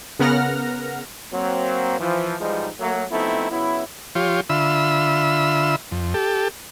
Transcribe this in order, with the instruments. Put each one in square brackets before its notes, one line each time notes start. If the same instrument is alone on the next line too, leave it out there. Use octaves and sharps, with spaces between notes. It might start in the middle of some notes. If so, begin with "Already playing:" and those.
[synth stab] C#3 B3 A#4 F#5 F6 A#6
[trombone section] F#3 A#3 C4
E3 F3
G#2 E3 F3 G3 G#3 D#4
F#3 A3 A#3
F3 A3 B3 C4 D#4 E4
C#3 F#3 B3 E4
[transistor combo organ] F3 F4 G4 C#5
D3 F4 E5 B5 E6
F2
G4 A4